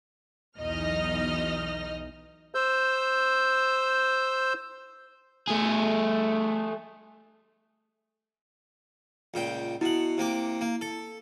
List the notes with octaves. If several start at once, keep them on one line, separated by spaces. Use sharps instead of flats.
B1 E2 D#4 D#5 F6
C5 E6 G6
A3 G#4
C#2 A#2 G5
B2 E4 F#5
C3 A#3 D6
A#3
A4